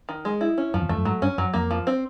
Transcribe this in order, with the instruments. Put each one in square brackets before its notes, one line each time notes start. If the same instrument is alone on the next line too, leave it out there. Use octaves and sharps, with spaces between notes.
[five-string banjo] D#3
G#3
E4
C#4
[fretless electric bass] F#2 [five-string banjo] F3
[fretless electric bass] E2
[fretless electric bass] F2 [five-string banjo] A3
[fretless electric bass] F#2
[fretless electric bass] G#2 [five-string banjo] F#3
[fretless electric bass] G2 [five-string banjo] C#4
[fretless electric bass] F#2 [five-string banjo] F#3
[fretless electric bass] F2 [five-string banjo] A#3
[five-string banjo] F3
C4